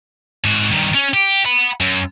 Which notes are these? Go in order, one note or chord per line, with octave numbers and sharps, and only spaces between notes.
G#2 F#4
G2 D#3
C#4
G4
F#5 B5
F#2